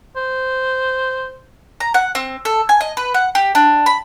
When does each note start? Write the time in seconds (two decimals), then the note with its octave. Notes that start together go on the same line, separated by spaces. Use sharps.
0.17 C5
1.80 A#5
1.94 F#5
2.15 C4
2.45 A4
2.69 G#5
2.81 D#5
2.97 B4
3.14 F#5
3.35 G4
3.55 D4
3.86 B5